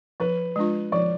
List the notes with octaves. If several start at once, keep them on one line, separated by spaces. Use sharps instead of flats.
F3 B4
G#3 D4 F4
F3 D5